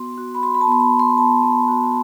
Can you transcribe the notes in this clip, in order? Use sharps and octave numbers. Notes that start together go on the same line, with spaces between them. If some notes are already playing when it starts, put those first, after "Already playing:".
Already playing: B3 F#4 C6
F#4
B5
F#4 C6
B5
A5
B3 C6
B5
B3
C6
B3 A5
B3
F#4